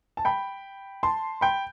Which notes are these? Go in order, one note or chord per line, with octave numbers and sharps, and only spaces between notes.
A5
G5 B5
A5 C6
G5 B5